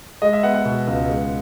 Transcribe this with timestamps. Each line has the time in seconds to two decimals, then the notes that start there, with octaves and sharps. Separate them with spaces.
0.22 G#3 D#5
0.33 E5
0.43 B3 F#5
0.54 F#5
0.65 B2
0.87 C#2
1.09 G#3